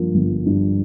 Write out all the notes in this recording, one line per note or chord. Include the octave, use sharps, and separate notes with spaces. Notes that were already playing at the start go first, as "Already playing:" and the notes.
Already playing: G2 F3 A#3
G1
G2